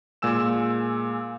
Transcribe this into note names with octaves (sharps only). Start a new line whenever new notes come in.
A#2 G#3 G#5 E6 E7